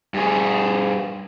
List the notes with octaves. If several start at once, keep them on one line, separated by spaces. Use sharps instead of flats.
G2 G#4